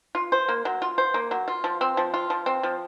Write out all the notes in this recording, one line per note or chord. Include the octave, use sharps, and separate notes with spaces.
F4
C5
A#3
F#3
F4
C5
A#3
F#3
F4
F3
C4
F3
F4
F3
C4
F3